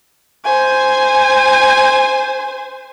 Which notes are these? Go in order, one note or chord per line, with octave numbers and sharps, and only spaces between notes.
C5 G#5